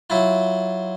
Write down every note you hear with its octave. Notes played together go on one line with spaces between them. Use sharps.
F#3 E4 F4